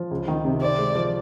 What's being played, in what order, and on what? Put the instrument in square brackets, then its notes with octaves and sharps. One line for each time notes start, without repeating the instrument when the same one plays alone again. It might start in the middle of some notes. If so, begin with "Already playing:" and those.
Already playing: [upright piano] F3
C#2
D#3
C3
[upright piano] C4 [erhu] D5
[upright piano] G#3
F3